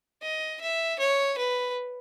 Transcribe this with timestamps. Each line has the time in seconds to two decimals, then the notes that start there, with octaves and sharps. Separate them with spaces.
0.21 D#5
0.61 E5
0.99 C#5
1.38 B4